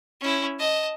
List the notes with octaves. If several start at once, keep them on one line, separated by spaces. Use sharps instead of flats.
C#4 E4
D#5 A5